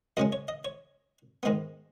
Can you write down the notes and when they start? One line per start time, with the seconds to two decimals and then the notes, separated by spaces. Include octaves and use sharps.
0.17 F#2 C#3 G#3 C#4 D#5
0.32 C#5
0.48 D#5
0.65 C#5
1.43 G#2 D#3 G#3 B3